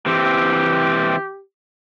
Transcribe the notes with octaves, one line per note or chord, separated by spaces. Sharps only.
E3 C4 G4